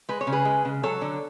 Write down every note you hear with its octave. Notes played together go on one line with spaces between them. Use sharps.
G#3 B4
C#5
C#3
G#4 B4
G#3
C#3
F#3 A4 C#5
D3